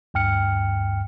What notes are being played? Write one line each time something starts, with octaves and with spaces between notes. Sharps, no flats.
D2 G2 G5 F6 C#7